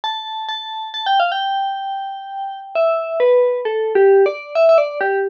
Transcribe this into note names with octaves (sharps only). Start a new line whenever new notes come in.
A5
A5
A5
G5
F5
G5
E5
B4
A4
G4
D5
E5
E5
D5
G4